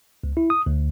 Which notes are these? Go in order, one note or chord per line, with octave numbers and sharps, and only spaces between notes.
C#2
E4
D#6
D2